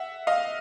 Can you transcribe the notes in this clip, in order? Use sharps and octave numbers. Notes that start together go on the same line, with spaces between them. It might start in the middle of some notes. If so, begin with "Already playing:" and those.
Already playing: E5 F#5
D#5 F5